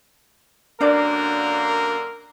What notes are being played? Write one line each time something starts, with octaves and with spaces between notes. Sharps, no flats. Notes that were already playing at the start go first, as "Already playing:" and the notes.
F#2 D3 A#3 D4 A#4 D5